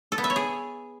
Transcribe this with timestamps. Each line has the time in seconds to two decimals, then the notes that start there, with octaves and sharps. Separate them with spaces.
0.12 A4
0.18 B3
0.24 E5
0.30 C#5
0.36 G#4